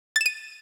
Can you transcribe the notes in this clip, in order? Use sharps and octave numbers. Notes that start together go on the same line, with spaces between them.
A6 D#7 E7